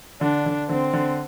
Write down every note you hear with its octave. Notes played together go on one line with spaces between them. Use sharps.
D3 D4
D3
D3 C4
D3